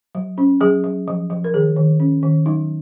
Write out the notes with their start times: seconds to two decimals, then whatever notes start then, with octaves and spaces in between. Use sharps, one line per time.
0.15 F#3
0.38 C#4
0.61 F#3 G#4
0.84 F#3
1.08 F3
1.30 F3
1.44 A#4
1.54 D#3 G#4
1.76 D#3
2.00 C#4
2.23 D#3
2.46 F#3 D#4